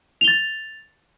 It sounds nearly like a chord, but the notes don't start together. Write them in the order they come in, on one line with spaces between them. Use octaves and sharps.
F7 G7 A6